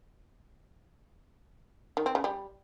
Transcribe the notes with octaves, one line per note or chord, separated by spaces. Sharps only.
D#3
C4
C#3
G3